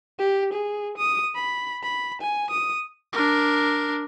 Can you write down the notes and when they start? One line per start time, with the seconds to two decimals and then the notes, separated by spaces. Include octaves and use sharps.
0.19 G4
0.53 G#4
0.98 D#6
1.35 B5
1.84 B5
2.22 G#5
2.51 D#6
3.13 D4 A#4